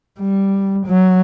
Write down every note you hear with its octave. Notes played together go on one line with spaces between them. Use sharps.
G3
F#3